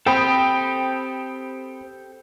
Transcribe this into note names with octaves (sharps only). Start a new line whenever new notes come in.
C4 G4 A4 G5 B5 D#6